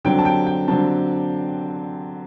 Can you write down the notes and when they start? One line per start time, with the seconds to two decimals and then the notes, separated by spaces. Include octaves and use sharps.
0.05 D3 F#3 C4 G5
0.19 A5
0.25 G5
0.47 G5
0.68 D3 F#3 C4 A5